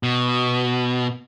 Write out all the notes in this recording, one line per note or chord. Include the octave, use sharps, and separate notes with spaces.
B2